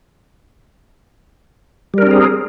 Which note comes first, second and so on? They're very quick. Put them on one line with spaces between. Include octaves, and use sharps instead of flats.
G3 A#4 D4 C4 G#4